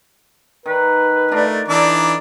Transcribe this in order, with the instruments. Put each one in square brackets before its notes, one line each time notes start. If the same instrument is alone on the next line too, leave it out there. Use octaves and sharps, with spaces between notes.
[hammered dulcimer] D#3 [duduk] B4
[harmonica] A3 [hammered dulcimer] D4 F4 A#4
[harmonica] E3 D4 D6 [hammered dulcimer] D#4 A4 D5